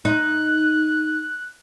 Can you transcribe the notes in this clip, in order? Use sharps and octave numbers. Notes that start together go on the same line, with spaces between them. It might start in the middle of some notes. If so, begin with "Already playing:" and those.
D#4 F#6